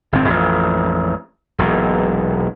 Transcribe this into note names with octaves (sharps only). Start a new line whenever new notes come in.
G1 A2 C4
A1 F2
E1 B1 A#2